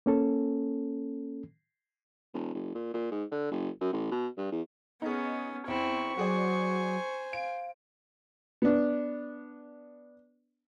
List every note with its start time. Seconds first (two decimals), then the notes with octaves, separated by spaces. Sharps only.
0.06 A#3 C#4 A4
2.34 E1
2.55 F#1
2.75 A#2
2.94 A#2
3.11 G#2
3.32 D3
3.51 F#1
3.81 F#2
3.93 A1
4.11 B2
4.37 G2
4.52 E2
5.02 B3 C#4 D#4 G#4
5.68 E2 C4 E4 C#6
6.17 F#3 F#4 G#4 C5 D5 G#5
7.33 F5 D7
8.62 B3 D4